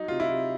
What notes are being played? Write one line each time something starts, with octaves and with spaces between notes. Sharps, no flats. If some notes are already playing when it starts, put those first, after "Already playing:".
Already playing: F#3 D#4
C3 F4
E4
C3